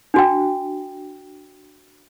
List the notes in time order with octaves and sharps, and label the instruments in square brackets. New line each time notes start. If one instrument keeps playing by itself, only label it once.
[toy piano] D4 F#4 G5